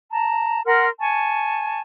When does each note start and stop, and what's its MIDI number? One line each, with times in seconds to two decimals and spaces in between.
0.12 0.62 81
0.12 0.62 82
0.66 0.87 70
0.66 0.87 78
0.66 0.87 84
0.66 0.87 89
1.00 1.81 80
1.00 1.81 81
1.00 1.81 85